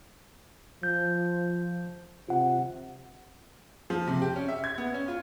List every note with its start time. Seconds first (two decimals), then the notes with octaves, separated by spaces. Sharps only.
0.83 F3 G6
2.29 C3 F4 F#5
3.90 F3
4.07 C3
4.22 G4
4.36 C#4
4.48 E5
4.64 G#6
4.78 B3
4.94 C#4
5.08 F4